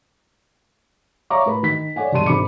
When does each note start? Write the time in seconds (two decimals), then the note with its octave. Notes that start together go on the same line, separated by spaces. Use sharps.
1.30 C#5 E5 F5 A#5 C#6 D6
1.46 A2 B4 B5
1.63 D#3 B6
1.96 A4 C#5 D5 F#5 G#5
2.12 E1 G2 G#3 A5 C6 D#7
2.26 G#1 B5 D6 C#7